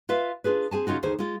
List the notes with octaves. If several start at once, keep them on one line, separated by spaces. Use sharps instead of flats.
F4 B4 E5 F5
D4 F4 G#4 B4
C4 G#4 G#5 A5
C#3 C#4 D#4 F4 F#4
D2 D#3 G#4 C5
G#3 F4